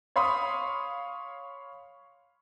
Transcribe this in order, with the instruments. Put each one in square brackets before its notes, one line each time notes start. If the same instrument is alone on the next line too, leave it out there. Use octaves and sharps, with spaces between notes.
[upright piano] C#5 F5 B5 C6 D#6